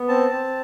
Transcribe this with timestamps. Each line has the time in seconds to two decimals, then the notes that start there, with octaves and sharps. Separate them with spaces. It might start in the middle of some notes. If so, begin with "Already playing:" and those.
Already playing: B3
0.08 C4 A5
0.31 C4